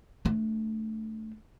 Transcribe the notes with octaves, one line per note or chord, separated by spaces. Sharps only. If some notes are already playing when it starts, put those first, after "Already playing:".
A3 D4